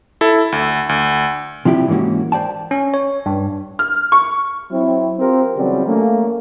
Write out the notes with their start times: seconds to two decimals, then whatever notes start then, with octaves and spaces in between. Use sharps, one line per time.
0.21 E4 A4
0.52 D2
0.89 D2
1.65 C3 F3 D4 E4 G4
1.88 G#2 E3 A#3 C#4 F#4
2.32 C5 D5 G5 A5
2.71 C#4
2.94 C#5
3.26 G2
3.79 F6
4.12 C#6
4.71 F#3 C4 E4
5.19 C4 F4 G4 A#4 C5
5.56 C#3 E3 F#3 G3 B3 C4
5.86 A3 A#3 C#4